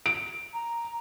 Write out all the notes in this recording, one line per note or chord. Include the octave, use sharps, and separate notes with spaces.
D7
A#5